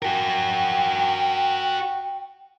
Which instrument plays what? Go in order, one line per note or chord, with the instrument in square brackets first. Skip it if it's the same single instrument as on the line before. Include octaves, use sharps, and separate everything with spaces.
[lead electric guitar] F#4 A#4 [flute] G5